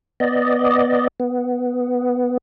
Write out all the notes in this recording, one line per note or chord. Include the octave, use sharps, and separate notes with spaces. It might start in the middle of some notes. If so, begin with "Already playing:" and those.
B3 D5 D#5
B3